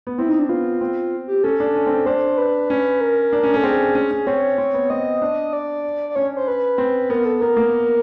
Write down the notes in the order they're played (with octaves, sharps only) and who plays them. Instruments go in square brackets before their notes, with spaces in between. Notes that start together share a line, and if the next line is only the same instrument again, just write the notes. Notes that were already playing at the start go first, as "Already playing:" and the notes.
[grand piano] B3
[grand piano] C4 [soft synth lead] E4
[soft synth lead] D#4
D4
[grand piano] B3 [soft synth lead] F4
[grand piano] C4
[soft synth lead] G4
[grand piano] C#4 [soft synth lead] A4
[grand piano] D4
C#4
C4
C#4
[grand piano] D4 [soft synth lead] C5
[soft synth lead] B4
[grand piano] C#4
[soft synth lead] A#4
[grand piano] D4
C#4
[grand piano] C#4 [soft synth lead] A4
[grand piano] C4 [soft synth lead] G#4
[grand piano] C#4
C#4
[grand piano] C4 [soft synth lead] C#5
[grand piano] C4
B3
[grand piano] C4 [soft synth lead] D#5
[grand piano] D4
[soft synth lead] D5
D5
[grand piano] C#4 [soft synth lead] C#5
[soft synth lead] C5
B4
[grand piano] C4
[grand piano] B3 [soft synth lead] A#4
[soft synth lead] A4
A4
[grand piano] B3 [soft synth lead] A#4
[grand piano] A#3